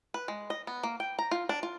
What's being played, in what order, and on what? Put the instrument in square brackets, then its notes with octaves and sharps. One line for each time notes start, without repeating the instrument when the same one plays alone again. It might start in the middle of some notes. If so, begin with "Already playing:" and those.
[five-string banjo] B4
G#3
D#5
B3
A#3
G5
A#5
F4
D4
F4